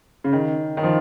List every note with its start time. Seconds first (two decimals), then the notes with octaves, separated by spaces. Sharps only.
0.24 C#3
0.33 D#3
0.77 D#3
0.83 F3